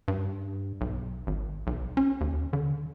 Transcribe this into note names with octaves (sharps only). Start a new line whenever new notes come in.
G2
B1
G#1
B1
C#4
D#2
D3